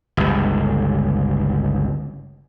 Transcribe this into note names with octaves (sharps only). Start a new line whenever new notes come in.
G1 C#2